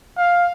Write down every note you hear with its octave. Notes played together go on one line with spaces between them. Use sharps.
F5